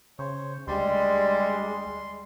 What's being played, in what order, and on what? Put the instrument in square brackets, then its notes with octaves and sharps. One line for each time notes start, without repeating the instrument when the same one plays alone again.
[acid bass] C#3 [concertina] C5 C#5
[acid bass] D2 [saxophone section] G3 [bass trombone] G#3 [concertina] C6